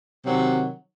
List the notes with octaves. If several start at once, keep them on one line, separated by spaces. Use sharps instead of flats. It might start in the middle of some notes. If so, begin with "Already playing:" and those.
C3 D#3 F#3